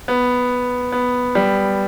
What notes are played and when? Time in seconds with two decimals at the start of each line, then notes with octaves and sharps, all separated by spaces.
0.08 B3
0.92 B3
1.35 G3